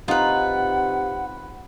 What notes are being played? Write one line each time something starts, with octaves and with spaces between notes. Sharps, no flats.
C3 D#4 F4 B4 F#5